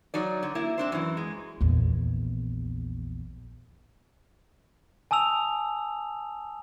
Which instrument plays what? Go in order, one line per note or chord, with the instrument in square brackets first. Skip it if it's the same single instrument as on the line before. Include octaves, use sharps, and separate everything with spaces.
[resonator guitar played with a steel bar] F#3 D#4 D5
D3
A#3 E4
C4 D4 C5
F#2 E3
G#3
[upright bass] A#1 E2
[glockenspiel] G#5 A5 D#6 E6 F7